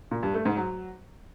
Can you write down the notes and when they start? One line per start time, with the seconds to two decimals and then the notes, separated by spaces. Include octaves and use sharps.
0.11 A#2
0.23 G2
0.34 A3
0.45 G#2
0.57 F#3